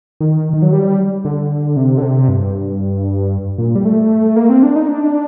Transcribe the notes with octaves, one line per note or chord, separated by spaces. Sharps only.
D#3
D#3
F#3
G3
D3
C3
D3
C3
G2
A#2
G3
A3
A#3
C4
D4
D#4
D4